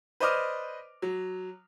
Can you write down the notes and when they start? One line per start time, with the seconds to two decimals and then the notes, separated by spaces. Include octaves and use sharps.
0.20 B4 C5 D5 D#5 D6 F6
1.02 F#3